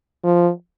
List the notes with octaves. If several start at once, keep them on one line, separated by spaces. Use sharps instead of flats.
F3